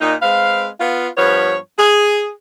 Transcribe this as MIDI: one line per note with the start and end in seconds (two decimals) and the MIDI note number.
0.01 0.15 46
0.01 0.15 63
0.22 0.68 56
0.22 0.68 60
0.22 0.68 71
0.22 0.68 77
0.80 1.09 59
0.80 1.09 65
1.18 1.56 43
1.18 1.56 53
1.18 1.56 59
1.18 1.56 73
1.78 2.31 68